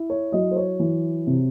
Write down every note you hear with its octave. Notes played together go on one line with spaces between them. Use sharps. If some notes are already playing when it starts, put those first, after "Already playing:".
Already playing: E4
C#5
F#3 D#5
C5
C#5
E3
C3